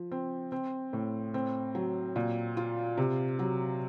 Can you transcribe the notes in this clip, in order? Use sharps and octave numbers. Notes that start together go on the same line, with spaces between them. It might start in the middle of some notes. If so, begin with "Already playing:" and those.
Already playing: F3
C4
C4
A2
C4
F#3
A#2
F4
C3
F#3